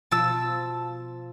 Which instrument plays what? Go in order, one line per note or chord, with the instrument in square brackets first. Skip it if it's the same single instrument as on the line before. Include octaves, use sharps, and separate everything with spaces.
[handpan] B2 F3 F4 [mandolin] A5 E6